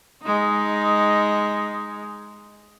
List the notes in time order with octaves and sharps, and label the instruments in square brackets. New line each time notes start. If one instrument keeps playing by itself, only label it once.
[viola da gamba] G#3 D#4